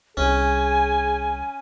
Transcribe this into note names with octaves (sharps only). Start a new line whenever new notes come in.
C2 C#4 G#4 G#5